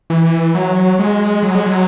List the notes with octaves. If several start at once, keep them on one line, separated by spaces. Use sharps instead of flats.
E3
F#3
G#3
F#3
G#3
F#3